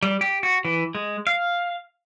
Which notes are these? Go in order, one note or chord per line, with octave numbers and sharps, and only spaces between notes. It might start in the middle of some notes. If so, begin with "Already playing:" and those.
G3
G4
F#4
E3
G#3
F5